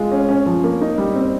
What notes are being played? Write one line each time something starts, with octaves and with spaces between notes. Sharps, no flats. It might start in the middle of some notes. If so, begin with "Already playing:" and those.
Already playing: G#3 F4
C#4
C#4
F3
A#3
D#4
G3
C4